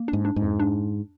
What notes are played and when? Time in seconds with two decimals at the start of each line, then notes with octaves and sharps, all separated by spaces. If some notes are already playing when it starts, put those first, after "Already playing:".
Already playing: A#3
0.08 D4
0.13 G#2
0.25 D4
0.36 G#2
0.42 F2
0.59 D4